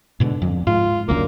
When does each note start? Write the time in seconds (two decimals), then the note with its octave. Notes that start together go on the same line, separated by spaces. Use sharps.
0.20 G#2 B2 D3
0.42 F2
0.67 G#2 F4
1.08 F#1 D2 C#3 A#3